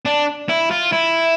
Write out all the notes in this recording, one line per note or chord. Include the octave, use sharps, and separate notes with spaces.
D4
E4
F4
E4